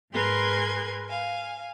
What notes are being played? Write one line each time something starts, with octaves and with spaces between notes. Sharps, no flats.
G#2 G#4 A#4 B4 C6 G#6
F5 G#5